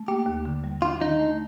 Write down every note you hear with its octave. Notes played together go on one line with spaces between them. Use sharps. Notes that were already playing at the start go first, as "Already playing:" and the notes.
Already playing: A3
A#3 G4
D#2
D3
G3
D4 F4
D#3 D#4
A3